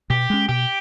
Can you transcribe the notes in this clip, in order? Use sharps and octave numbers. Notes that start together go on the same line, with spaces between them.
B2 G4
G#3 C#4
B2 G4